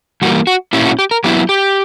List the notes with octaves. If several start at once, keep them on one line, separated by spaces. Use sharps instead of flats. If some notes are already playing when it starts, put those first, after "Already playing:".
E3 G3 A#3 F#4
F#4
A#2 A#3 C#4 E4 G4
F#4
G4
A#4
F#3 B3 E4 G4
G4